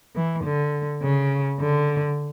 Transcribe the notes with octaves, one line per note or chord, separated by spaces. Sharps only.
E3
D3
C#3
D3